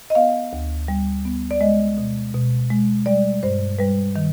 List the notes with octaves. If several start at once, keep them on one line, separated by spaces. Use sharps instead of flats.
D#5
B3 F5
D2
G3
B3
D5
G#3 D#5
B2
B2
G#3
G3 D5
G2 C5
G3 B4
D#3